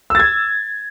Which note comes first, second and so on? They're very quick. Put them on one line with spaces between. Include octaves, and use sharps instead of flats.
E6 A6 G#6